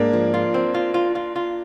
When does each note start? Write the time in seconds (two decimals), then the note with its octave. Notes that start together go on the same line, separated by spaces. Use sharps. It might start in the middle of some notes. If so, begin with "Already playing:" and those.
Already playing: G#2 A#3 D4
0.13 F3
0.34 F4
0.54 C4
0.74 F4
0.94 F4
1.15 F4
1.36 F4